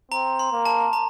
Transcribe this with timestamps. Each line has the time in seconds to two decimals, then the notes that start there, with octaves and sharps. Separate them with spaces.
0.12 C4 A#5
0.39 C6
0.53 A#3
0.65 A5
0.93 A#5